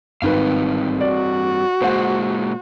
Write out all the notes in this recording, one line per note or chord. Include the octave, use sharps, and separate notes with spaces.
G#1 G2 D#3 C4 B4 F5
F#4 D5
A#2 G#3 C5 F#5